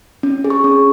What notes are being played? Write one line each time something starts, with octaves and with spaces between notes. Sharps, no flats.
C#4
G#4
C#6
C#4